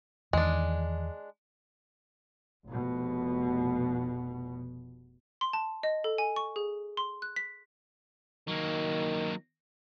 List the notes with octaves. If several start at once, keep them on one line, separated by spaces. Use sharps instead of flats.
E2 D#3 G#3 D4
F1 B2
C6
A5
D#5
A4
G#5
C#6
G#4
C6
F#6
B6
D#3 F#3 A#3